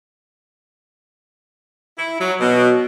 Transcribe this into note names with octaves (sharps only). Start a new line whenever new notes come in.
E4
F#3
B2